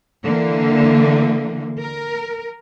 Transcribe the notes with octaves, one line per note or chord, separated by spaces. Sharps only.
D3 E3 A#3
A#4